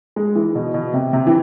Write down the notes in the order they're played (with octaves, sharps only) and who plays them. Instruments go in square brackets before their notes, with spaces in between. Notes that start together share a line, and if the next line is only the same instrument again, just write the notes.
[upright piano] G#3
E3
B2
B2
C3
C3
E3